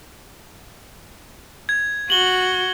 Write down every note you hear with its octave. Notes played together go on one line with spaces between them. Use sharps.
G#6
F#4 F#7 G7